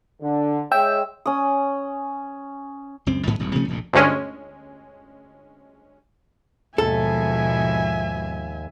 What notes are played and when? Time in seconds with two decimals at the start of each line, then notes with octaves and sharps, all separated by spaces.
0.22 D3
0.72 G#3 C#5 E5 G5
1.26 C#4 D#6
3.06 C#2 F#2 C4
3.27 G#2 D#3 F#3 B3
3.39 D#1 C2 F#2
3.55 C3 F3 A3 C#4
3.68 F1 A#1 F2 A#2
3.93 G1 D2 G#3 C#4
6.78 D#2 G#2 B2 F3 A4 E5 G#5